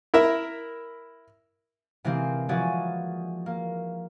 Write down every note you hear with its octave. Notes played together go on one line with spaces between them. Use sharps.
E4 A#4 E5
C3 E3 G#3 A#3 C4
E3 F3 F#4 G#4 C#5 D5
A#3